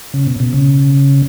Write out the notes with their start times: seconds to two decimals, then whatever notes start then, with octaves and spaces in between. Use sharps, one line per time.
0.14 C#3
0.27 B2
0.40 B2
0.53 C#3